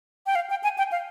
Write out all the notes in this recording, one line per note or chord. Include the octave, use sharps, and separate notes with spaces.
G5
F5
G5
G#5
G5
F5